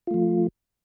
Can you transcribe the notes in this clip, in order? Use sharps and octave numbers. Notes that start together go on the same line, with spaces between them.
F3 A3 F4